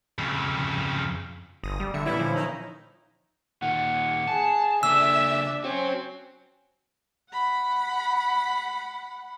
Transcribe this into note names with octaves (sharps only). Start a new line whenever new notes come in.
F2 C#3
G1 D#6 A#6
G3
D3 E5 C#7
A#2 D3 E3 G3 B3 C#4 E4
F3
D#3 C#4 D#4
A#2 D#3 F#5
G#4 A5
C#3 A#3 D4 A4 E5 E6
C4 C#4 F#4 C#5
F#5 B5